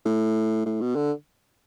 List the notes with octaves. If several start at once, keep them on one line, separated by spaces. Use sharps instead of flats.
A2
A2
B2
D3